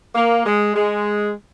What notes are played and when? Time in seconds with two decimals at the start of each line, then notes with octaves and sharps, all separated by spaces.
0.15 A#3
0.46 G#3
0.76 G#3